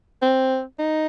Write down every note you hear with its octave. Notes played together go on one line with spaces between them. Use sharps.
C4
D#4